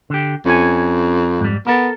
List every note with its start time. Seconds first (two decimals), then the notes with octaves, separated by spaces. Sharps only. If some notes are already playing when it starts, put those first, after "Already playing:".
0.10 D3 G4
0.46 F2 C#4 G#5
1.40 G#2 G3
1.67 B3 A4 A#4